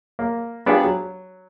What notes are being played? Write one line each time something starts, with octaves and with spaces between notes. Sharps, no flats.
A#3
B3 D4 F4 G4 G#4
F#3